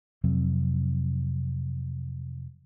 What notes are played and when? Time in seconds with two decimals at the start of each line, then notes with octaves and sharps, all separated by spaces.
0.24 F2 C3 F#3 C4